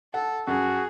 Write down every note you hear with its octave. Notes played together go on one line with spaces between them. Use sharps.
A4 F#5
F#2 F#4 G#4